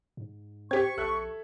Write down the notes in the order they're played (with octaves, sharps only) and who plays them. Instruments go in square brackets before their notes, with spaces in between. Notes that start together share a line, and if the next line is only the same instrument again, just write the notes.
[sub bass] G#2
[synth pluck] C4 G4 [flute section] C#6 [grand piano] G#6 B6
[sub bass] A#1 [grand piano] A4 E5 F#6